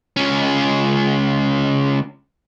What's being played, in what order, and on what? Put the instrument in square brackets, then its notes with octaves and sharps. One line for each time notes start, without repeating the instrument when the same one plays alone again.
[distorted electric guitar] C#2 C#4